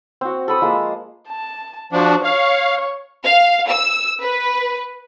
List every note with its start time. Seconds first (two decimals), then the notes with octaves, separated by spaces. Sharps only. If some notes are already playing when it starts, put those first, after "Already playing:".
0.21 C4 F#4
0.48 A4 B5 D#6
0.61 F3 G#3 A#3 A5
1.28 A5
1.93 F3 D4 F#4
2.24 C#5 F5 C#6
3.24 F5
3.68 E6
4.21 B4